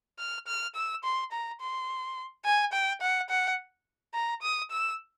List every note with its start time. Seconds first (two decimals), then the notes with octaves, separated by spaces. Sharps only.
0.19 F6
0.47 F6
0.75 E6
1.04 C6
1.32 A#5
1.60 C6
2.45 G#5
2.73 G5
3.01 F#5
3.30 F#5
4.14 A#5
4.42 D#6
4.71 E6